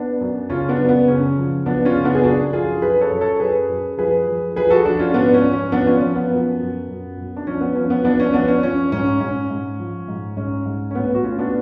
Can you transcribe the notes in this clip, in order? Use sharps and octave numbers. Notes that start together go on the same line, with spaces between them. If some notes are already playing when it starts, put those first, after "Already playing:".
Already playing: B3 D4
F#2
C#3 C#4 F4
B3 D4
F#2
B3
C#3 C#4
F3
F#2 B3 D4
C#4 F4
C#3
B3 D4
G#4
F#2 D4 F#4
F3 F4 G#4
F#2 G#4 B4
A4 C#5
F#2
A4 C#5
F#2 G#4 B4
F#2
F3 G#4 B4
F3
F3 G#4 B4
F#4 A4
F3 D4 F#4
C#4 F4
G#2 B3 D4
C#4
F3
C#4
F3 B3 D4
C#4 F4
F3 C#4
B3
F#2
F#2
F#2
F#2
D4
F3 C#4
B3
F3 C#4
B3
F3 B3 D4
C#4
F3 B3 D4
C#4
F3 C#4
G#2 C#4
G#2 C#4
G#2
F3
G#2
G#2 C#4
G#2
C#4
A2 B3
F#4
A2 C#4 F4
B3 D4